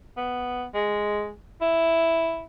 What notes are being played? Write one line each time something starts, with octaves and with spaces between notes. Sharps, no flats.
B3
G#3
E4